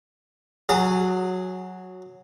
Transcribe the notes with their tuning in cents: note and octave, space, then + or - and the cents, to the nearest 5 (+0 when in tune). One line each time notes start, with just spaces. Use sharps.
F#3 -5 G#4 +0 A5 +45